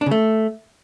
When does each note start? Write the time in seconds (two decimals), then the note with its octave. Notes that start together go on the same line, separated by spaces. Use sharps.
0.01 D4
0.06 C#3
0.11 A3